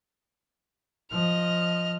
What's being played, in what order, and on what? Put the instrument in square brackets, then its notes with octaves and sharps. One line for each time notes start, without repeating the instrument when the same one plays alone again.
[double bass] F3 [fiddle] D#5 F6